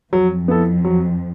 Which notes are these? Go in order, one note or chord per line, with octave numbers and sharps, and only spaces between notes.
F2 F#3
B3 E4 A4
F#3